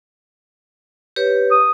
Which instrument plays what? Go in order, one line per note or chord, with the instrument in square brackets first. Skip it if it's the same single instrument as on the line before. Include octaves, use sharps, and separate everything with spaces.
[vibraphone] G4 B4 C#5
[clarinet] D#6